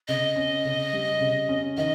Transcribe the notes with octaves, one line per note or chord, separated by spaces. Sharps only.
C#3 D#5
C#4
C#3
G3
C#3
C#4
D#3 D#5